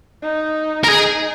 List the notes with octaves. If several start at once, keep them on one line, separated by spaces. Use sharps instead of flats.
D#4
A#4
D#4 G#4